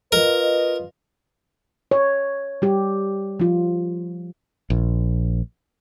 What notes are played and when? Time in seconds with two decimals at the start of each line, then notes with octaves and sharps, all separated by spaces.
0.12 F4 A#4 B4 D#5
1.91 C#5
2.62 G3 G4
3.40 F3 F4
4.70 A#1